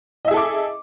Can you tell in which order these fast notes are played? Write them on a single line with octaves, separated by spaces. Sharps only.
D#5 E5 G#4 A4 D6